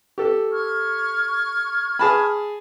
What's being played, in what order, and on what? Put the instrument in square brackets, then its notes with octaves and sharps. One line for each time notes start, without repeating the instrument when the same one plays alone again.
[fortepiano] G4 A4
[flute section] C#6 F6 G#6
[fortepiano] G#4 A5 B5